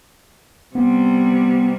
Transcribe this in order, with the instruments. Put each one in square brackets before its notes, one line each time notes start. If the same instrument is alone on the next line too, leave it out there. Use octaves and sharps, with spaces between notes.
[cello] C3 G3 [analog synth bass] B3